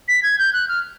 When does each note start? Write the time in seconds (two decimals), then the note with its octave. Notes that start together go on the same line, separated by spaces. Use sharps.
0.08 B6
0.23 G#6
0.39 G6
0.53 F#6
0.68 F6